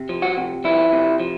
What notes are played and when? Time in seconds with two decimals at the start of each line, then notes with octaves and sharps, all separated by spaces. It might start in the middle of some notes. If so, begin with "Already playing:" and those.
Already playing: C3
0.09 F3
0.22 F#4
0.37 C3
0.64 F3 E4
0.92 C3
1.20 F3